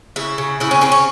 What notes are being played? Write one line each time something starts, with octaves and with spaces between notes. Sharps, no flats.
C#3 E4
C#3
C#3 E4
C#4
C#3 C4
C#4